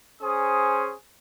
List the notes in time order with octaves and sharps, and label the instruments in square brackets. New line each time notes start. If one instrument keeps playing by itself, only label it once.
[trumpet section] C#4 G#4 C5 D#6